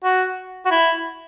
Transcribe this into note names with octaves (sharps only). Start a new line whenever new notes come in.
F#4
F#4
E4